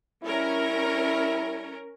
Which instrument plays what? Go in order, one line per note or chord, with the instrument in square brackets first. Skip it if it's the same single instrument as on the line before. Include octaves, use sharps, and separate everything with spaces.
[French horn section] G3 D4 E4 [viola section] C#4 A#4